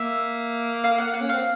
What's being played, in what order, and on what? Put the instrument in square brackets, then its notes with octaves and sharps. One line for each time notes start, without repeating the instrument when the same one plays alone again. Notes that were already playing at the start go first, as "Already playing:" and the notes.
Already playing: [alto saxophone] A#3 [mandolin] E5
[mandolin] F5
F#5
F#5
[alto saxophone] C#4
[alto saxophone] C4 [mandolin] F5